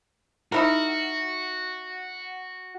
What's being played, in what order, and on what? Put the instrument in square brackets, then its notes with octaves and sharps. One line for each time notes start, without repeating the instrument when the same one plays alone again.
[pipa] D#4 E4 A#4 [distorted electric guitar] F#4